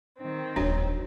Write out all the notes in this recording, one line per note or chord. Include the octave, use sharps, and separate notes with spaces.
D#3 C4
D#1 F3 D4 F#4 C#5